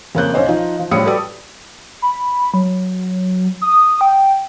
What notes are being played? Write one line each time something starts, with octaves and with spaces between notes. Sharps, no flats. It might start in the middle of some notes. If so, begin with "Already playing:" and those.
F2 C#3 A#3 C#5 F#6 G6
B1 C#4 C5 D#5
F3 D#4 F4
F3
A2 F3 G3 C#5 D#6 C#7
F#4 G4 A4 B4 D5 D#6
B5
F#3
D#6
G5